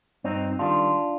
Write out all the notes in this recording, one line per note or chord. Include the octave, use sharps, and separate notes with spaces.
G2 C4 D#4
D#3 G3 D4 F4